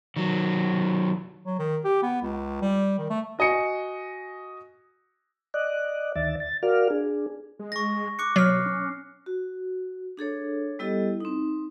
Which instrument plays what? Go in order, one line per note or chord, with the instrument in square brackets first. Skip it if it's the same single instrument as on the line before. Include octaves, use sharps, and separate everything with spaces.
[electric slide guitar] D#3 F#3
[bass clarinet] F#3
D#3
G4
B3
C#2
G3
D#3
A3
[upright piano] F#4 D#5 G#5 C#7
[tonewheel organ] D5 D#5 F#6
D2 D#3 D5 E5 A6
A6
F#4 A#4 D5 F5 F6
D4 G#4
[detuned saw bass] G#3
[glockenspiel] C#6 A#6
D6 F#6 C#7
[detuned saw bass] B2 [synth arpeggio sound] F#3 [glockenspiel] F6 C7
[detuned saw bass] C#4
[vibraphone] F#4
D4 G#4 A4 C#5
G3 B3 E4 G4 A4 D#5
C4 D#4